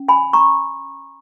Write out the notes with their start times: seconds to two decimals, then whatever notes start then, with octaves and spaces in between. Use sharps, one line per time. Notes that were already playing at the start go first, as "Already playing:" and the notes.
Already playing: C#4
0.08 G#5 B5
0.33 A#5 C#6